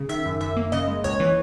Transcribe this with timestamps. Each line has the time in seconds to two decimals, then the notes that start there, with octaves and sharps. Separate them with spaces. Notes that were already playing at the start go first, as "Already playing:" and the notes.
Already playing: C#3
0.09 D#3 E5
0.25 F#2
0.41 F#2 E5
0.56 A#3
0.72 C#3 D#5
0.88 G#3
1.04 C#2 C#5
1.20 E3